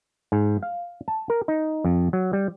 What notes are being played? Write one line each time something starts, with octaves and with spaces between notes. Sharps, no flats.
G#2
F5
A5
A#4
D#4
F2
F#3
G3